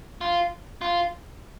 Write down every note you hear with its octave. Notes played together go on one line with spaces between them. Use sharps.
F4
F4